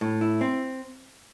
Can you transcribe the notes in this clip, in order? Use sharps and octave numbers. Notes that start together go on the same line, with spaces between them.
A2
E4
C4